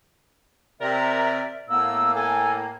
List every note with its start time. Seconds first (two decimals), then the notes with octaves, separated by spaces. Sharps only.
0.81 C3 A#4 D5 E5
1.70 A2 A#3 B3 E6
2.15 A4 G#5